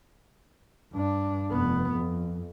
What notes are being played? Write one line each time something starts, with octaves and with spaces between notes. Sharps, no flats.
G2 D4
F1 B3
F2